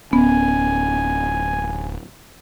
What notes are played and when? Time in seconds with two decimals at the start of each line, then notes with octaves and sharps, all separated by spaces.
0.13 D1 B3 C#4 G#5